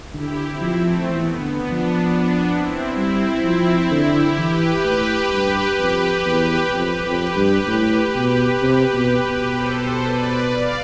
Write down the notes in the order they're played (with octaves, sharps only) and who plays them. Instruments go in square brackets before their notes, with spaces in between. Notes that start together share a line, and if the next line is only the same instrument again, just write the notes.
[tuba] D3 [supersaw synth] E4 G4
[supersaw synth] C4 E4
[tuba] F3
[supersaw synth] A3 C4
[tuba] E3 [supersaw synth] B3
[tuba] D3
[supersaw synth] B3 D4
[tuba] F3
[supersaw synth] B3 D4
C4 E4
[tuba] G3 [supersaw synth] C4 E4
[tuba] F3 [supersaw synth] C4 E4
[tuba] D3 [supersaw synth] E4 G4
[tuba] E3 [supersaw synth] G4 B4
[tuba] A2
G2
F2
E2
[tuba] F2 [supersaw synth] G4 B4
[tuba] F2
G2
A2
B2
C3
B2
B2
[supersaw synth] A4 C5
B4 D5
D5 F5